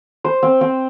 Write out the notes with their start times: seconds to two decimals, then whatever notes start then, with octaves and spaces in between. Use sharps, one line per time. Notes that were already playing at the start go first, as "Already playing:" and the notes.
0.24 C5
0.43 C4
0.61 C4